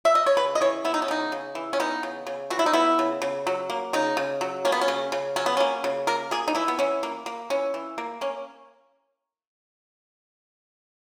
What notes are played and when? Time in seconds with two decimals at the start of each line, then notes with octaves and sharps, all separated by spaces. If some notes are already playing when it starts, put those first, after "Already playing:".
0.05 E5
0.15 D#5
0.26 C#5
0.37 C#3 B4
0.55 D#5
0.61 E3 C#5
0.84 B3 E4
0.94 D#4
1.02 C#4
1.08 C#3 D#4
1.32 C#3
1.55 E3
1.73 C#4
1.80 B3 D#4
2.03 C#3
2.27 C#3
2.50 E3 F#4
2.59 E4
2.66 D#4
2.73 B3 E4
2.99 C#3
3.22 C#3
3.47 F#3
3.70 A#3
3.93 C#3 D#4
4.17 C#3
4.41 F#3
4.65 A#3 C#4
4.72 B3
4.81 C#4
4.88 C#3
5.12 C#3
5.36 F#3 C#4
5.46 B3
5.57 A#3 C#4
5.84 C#3
6.07 A#3 A#4
6.31 A#3 G#4
6.48 D#4
6.55 E3 E4
6.68 B3
6.79 E3 C#4
7.03 A#3
7.26 A#3
7.50 E3 C#4
7.74 E3
7.98 A#3
8.21 A#3 C#4